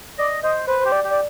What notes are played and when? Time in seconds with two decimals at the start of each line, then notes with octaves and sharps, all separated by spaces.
0.18 D5 D#5
0.43 C5 D#5
0.67 B4 C5
0.80 C5
0.85 G4
0.92 D5
1.04 G4
1.10 D5